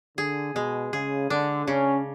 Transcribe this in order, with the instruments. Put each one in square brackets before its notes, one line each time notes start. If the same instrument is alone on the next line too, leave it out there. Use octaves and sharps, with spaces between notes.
[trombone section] D3 [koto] G#4
[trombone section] B2 [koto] G#3
[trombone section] C#3 [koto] G#4
[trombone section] D3 [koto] D4
[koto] C#3 [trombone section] C#4